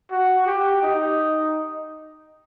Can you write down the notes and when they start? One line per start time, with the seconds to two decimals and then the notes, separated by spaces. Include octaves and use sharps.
0.11 F#4
0.46 G4
0.82 D#4